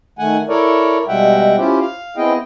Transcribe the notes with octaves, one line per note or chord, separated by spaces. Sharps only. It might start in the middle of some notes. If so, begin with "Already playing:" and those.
D#3 A3 F#5 G#5
E4 A4 A#4 C#5 D5
B2 G3 G#3 E5 F#5 G5
C#4 E4 F4 G4 C5
F5
B3 C4 E4 G#4 D#5 G5